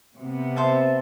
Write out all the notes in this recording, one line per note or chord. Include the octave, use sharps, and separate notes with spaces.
C3 B3
C5 E5 A5